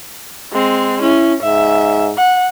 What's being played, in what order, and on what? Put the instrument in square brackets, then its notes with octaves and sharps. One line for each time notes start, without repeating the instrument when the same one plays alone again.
[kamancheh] G#3 C4
[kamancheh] C#4 [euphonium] E4
[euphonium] G#2 [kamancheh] E5
[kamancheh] F#5